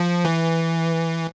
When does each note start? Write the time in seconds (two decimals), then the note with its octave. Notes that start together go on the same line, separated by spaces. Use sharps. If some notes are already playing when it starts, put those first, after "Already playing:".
Already playing: F3
0.25 E3